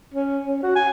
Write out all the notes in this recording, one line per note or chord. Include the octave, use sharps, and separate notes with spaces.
C#4
C#4
F#4
G#5